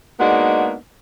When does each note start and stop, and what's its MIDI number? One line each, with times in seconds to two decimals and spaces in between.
0.20 0.75 56
0.20 0.75 58
0.20 0.75 59
0.20 0.75 62
0.20 0.75 63
0.20 0.75 66